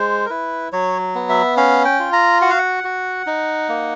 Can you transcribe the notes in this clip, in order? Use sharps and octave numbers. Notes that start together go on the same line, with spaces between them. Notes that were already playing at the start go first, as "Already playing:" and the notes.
Already playing: G#3 C5
A#4
E4 B4
F#3 C#5
B3
E5
C#4 F5
G5
F4
A#5
F#4 F#5
F5
F#5
F#4
D#4
A#3